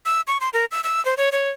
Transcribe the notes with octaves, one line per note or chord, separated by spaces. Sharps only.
E6
C#6
C6
A#4
E6
E6
C5
C#5
C#5